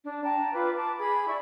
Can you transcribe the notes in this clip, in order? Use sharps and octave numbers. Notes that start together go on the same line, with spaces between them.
D4
G5 A5 A#5
F4 B4 D6
A5 D6
G#4 B5 G#6
E4 D5 E5 C#6